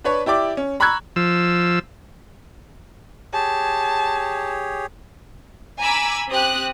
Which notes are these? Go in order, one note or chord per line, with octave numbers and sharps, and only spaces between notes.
D4 B4 C#5
E4 G4 D5 D6
C#4
A#5 B5 C#6 E6 F#6 G#6
F3 E6
G4 G#4 C#5 A5
G#5 A#5 B5 D6 E6
C4 G4 D#6 F#6